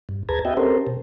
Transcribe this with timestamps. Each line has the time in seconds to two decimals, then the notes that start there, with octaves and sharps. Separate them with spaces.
0.09 G2
0.29 D2 G#4 B4 A5 A#5 G#6
0.45 B3 F#4 D#5 E5 G5
0.57 C4 C#4 G4 A4 A#4 C5
0.87 B2